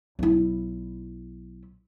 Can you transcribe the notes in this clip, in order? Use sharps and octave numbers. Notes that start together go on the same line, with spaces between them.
B1 E4